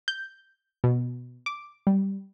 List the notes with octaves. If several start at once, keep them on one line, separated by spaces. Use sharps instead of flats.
G6
B2
D6
G3